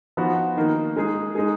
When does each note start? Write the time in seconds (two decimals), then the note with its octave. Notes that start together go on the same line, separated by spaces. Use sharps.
0.17 F3 B3 D#4 F#4
0.57 D#3 A#3 D#4
0.96 G#3 D#4 G#4
1.35 G#3 D#4 G#4